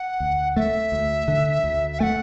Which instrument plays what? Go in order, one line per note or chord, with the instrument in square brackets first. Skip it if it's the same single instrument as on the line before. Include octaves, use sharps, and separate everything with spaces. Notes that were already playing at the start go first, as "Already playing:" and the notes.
Already playing: [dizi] F#5
[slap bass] D2
[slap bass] A3 [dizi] E5
[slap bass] D2
D3
D2
[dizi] E5
[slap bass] A3 [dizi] F#5 G#5